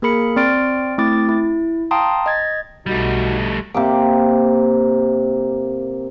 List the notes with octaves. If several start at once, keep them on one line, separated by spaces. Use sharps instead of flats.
A#3 G#4 A#4 B5 C#7
C4 D5 C6 F6 A6 D7
A3 C4 E4 D6 A6
E4
F5 G5 A5 A#5 C6 D#6
D#5 G#6 A6
B1 G3 A3 D#4 F#4
C3 A#3 D6